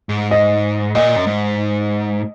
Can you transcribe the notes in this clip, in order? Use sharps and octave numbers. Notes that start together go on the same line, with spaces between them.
G#2
D#5
A#2 D#5
F#2
G#2